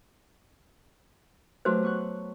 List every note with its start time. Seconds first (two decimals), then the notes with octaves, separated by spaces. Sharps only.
1.65 F#3 A3 F#4 G4 B4 C5
1.83 B3 C#6 F#6